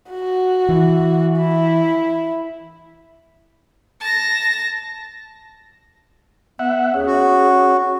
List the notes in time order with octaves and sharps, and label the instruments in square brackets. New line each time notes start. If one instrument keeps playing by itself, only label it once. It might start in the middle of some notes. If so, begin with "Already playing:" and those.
[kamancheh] F#4
[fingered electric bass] E3
[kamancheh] E4
[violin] A5 A#6
[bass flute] B3 [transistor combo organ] E5 F#5
[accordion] D#2 [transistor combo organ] C#4 [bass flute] G#4
[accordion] F#4
[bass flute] F#4